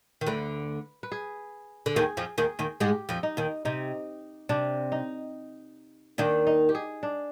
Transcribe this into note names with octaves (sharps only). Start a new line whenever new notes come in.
D#3
D2 D3 B4
B4
G#4
D3
D#2 D#3 G#4
F2 F3
D#2 D#3 G#4
D#2 D#3
G#2 G#3 G4
F2 F3
D#4
D#2 D#3
C3 D#4
C3 D4
D#4
D#2 D#3 D4
D#4
G4
G#4
D4